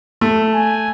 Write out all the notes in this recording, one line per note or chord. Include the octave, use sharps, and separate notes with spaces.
A3
G#5